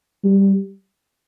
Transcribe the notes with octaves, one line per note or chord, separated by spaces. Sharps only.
G3